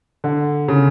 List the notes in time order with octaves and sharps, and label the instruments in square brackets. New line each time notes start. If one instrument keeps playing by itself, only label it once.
[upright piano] D3
C#3